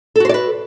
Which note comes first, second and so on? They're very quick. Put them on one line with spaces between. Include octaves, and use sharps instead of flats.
A4 F#4 C5 D5 B4